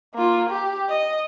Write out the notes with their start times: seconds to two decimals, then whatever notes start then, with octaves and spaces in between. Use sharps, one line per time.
0.14 A#3 F4
0.49 G4
0.89 D#5